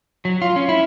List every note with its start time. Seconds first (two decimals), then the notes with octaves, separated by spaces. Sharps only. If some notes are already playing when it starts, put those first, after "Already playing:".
0.25 F#3
0.42 F4
0.56 C#4
0.69 E4